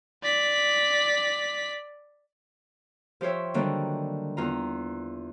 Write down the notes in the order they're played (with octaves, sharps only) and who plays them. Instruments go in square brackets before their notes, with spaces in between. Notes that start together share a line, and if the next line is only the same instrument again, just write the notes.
[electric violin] D5 B6
[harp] F3 G4 C5 C#5 E5
D3 D#3 F#3 G3 A#3 D4
E2 F4 A#5